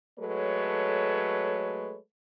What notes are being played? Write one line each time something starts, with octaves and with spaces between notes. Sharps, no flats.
F#3 G#3 A3 A4 B4 C#5